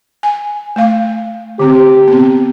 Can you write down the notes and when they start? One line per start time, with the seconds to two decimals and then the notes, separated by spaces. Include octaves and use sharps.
0.23 G#5
0.76 A3 F5
1.59 D3 C4 G4
2.08 B3 C4